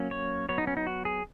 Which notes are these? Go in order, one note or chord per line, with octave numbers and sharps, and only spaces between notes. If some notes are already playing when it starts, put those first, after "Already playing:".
Already playing: F#3 A#3 C#4
C#5
F#3 B3 C#5
D#4
C#4
D#4
F#4
G#4